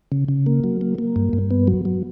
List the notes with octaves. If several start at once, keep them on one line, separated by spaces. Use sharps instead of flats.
C#3
C#3
A#3
F#3
A#3
A#3
G2
G2
B3
F#3
F#3